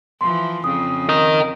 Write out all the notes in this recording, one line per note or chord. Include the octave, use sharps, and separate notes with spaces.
E3 F3 C6
F2 C#3 D#6
A#4 D#5